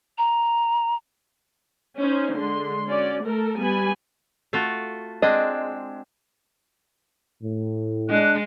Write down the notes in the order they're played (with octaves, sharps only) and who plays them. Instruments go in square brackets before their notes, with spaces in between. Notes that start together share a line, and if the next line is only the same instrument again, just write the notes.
[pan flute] A#5
[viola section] C#4 D#4 C5
D3 G#3 C6
C#4 F#4 D5
A3 A4 A#4
G3 B3 G#5 B5
[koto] A3 F4 F#4
[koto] G#3 C4 D4 [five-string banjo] D#5
[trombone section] A2
[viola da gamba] G#3 [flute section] D4 D#5 F#6